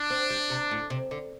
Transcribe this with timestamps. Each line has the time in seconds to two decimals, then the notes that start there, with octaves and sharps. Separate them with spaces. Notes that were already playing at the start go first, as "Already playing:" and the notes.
Already playing: D4
0.10 C4
0.30 G3
0.50 C3
0.71 A2
0.90 C3
1.11 D3